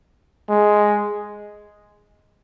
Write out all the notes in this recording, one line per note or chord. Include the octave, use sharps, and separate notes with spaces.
G#3